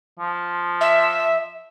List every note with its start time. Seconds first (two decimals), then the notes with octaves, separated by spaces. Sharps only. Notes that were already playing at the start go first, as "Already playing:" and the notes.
0.19 F3
0.80 E5